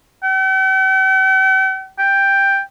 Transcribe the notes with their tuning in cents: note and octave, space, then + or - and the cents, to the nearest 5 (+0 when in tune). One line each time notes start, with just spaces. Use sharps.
G5 -45
G5 +5